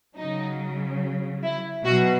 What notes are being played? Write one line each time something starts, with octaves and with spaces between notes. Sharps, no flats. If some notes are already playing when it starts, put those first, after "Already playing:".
C#3 F#3 D#4
E4
B2 F#3 F#4